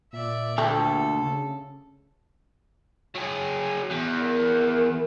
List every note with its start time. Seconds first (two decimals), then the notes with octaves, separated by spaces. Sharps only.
0.13 A#2 D5 E5
0.58 D2 A3 G4 A4
1.19 C#3
3.16 F#3 G#4
3.91 E2
4.18 A#4